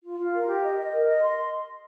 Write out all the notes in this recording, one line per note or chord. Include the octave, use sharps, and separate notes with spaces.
F4
F4
A#4
G4
D#5
D#5
A#4
D#5
C6